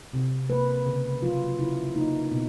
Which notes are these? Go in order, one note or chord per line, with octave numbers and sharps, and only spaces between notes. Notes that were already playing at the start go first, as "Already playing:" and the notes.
C3
A#3 B4
C#3
F#3 F4
C#3 E4
A#3 D#4
B2